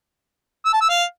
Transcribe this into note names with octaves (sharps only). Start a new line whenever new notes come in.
E6
A5
E6
F5